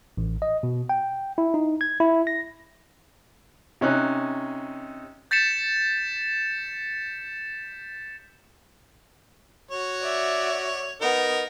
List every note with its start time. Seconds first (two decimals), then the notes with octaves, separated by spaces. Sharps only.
0.17 A1
0.42 D#5
0.63 B2
0.89 G5
1.38 E4
1.54 D#4
1.81 G#6
2.00 E4
2.27 A#6
3.81 C3 C#4 D#4 F#6
5.31 G6 A6 B6 C#7 E7
9.71 F#4 C#5
10.01 D5 E5
11.01 B3 D#4 A#4